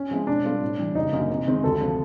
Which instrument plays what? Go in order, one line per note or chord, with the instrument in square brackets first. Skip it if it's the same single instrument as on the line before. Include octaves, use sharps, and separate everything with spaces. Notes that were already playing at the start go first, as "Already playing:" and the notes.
Already playing: [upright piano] C#4
[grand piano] F3 G#3 C4 E4
[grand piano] B2 [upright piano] D4
[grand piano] G3 C4 F4 A4
A2
E3 G3
[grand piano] F#1 [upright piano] D#4
[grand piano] F#2 D3 F#3 A#3
C3
D#3 G#3 C4
[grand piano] D2 [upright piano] A4
[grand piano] C3 F3